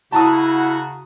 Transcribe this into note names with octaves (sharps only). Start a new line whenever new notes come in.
C#3 E4 F#4 A5 A#5 D#6